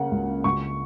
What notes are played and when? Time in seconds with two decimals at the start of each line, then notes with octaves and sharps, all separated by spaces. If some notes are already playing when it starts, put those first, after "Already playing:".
Already playing: C#3 A#3 F#5
0.11 C#2
0.44 C#2 C#6